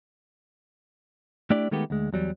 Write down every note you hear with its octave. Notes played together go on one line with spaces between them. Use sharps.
A3 D4 E4 G4 D5
D#3 G#3 A3 B3 G4
D2 G#3
E2 F#3 G3